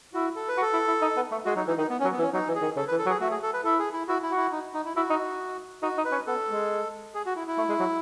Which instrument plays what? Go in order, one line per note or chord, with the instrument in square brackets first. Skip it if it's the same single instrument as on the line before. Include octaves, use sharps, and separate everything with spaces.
[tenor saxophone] E4 [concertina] F#4
[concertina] A4
B4
[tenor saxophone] F#4
[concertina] A4
[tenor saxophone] E4
E4
D#4
B3
A3
[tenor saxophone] G#3 [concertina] F#4
[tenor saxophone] F#3 [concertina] D#4
[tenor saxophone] E3 [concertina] D#4
[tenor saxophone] D#3 [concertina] D#4
[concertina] B3
C#4
[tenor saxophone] F#3
[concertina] B3
[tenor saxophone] E3
[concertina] C#4
[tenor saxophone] F#3 [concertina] D#4
[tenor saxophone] E3
[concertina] G#4
[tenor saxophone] D#3
[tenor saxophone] C#3 [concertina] A4
[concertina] B4
[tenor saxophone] E3
[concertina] A4
[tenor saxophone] F#3
[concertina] G#4
[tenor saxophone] A3 [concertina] F#4
[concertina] G#4
A4
B4
[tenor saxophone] E4 [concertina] A4
[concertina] G#4
E4
[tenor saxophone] E4 [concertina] F#4
[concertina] E4
[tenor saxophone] F#4
[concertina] E4
D#4
D#4
E4
[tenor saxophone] E4 [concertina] F#4
[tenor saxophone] D#4
[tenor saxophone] D#4 [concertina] F#4
[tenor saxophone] D#4
[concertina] B4
[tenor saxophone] C#4
[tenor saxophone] B3 [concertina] A4
[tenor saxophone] G#3
[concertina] G#4
F#4
E4
E4
[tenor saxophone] A3
G#3
F#3